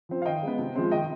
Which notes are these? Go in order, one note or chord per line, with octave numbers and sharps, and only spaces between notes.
F3 C4
F5
D#3 D#5 G5
G#3 B3
C3
F3 G#3 C4
D#3 D#5 G5